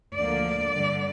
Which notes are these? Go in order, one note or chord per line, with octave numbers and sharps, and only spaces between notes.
D2 D3 F3 A#3 D5
G2 D3 G3